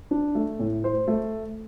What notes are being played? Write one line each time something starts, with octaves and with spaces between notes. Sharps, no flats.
D4
A3
A2
C5
A3